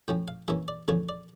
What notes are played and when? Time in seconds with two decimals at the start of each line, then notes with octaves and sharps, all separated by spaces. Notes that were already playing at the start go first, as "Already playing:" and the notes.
0.08 A2 F3 C#4 G5
0.28 F5
0.48 G2 E3 A#3 C#4 E5
0.68 D5
0.88 E2 D3 F3 A3 C#4 C#5
1.09 D5